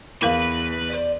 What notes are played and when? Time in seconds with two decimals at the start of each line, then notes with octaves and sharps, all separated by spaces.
0.22 E2 E4 A#4 B4 F5 B5
0.89 C5 D5